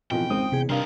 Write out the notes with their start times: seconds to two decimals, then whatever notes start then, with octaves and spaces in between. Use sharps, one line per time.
0.11 F2 B2 E3 F3 G5
0.30 G#1 C#2 G#3 C4 D#6
0.52 E2 C3 G#4
0.70 G2 C3 C4 D#4 A#4 F5